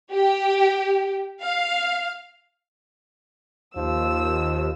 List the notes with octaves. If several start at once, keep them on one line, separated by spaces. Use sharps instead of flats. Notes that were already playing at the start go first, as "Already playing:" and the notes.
G4
F5
D#2 F3 E6